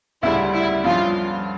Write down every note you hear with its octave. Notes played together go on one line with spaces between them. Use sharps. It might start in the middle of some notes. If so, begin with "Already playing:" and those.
D2 C#3 G3 E4
E4
G2 F3 C#4 F4